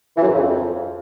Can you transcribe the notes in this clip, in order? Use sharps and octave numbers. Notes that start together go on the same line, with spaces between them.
E3
F#2
G#2
C#3
F2